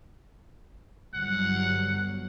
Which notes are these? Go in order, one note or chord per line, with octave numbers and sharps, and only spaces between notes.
G1 F#3 F#5